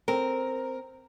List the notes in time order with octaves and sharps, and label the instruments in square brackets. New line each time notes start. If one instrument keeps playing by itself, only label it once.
[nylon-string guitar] C4 [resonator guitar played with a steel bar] A#4